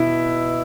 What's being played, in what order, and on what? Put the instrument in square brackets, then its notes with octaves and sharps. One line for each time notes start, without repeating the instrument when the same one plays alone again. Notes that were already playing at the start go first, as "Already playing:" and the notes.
Already playing: [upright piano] B2 E4